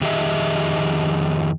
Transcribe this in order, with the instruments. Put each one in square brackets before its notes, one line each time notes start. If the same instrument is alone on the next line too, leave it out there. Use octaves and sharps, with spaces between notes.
[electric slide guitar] F2 D#3 G4 G#4 D#5 E5